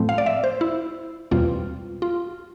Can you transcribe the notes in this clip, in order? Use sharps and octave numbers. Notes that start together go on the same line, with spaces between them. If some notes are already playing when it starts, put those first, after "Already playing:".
Already playing: A2 F3 A3 C4
F5
D5
E5
C5
E4
E2 B2 G3 C4 F4
F4